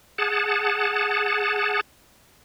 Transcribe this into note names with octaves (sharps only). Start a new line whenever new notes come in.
G#4 F#5 A5